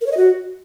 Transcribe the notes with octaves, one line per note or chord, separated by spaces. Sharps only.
A#4
C#5
D#5
F#4